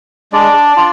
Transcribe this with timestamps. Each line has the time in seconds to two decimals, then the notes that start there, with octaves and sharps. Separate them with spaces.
0.33 G#3 D4 D5
0.76 D4 F4